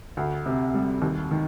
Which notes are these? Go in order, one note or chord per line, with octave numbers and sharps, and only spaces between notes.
D2
C3
G3
D#2
D#3